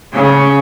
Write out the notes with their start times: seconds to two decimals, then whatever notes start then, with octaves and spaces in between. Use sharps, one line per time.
0.13 C#3